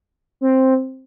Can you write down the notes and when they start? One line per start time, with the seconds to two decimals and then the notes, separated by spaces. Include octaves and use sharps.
0.41 C4